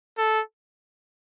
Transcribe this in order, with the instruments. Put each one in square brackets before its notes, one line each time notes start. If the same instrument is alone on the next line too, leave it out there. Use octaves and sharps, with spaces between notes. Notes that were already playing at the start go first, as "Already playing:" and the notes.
[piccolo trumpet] A4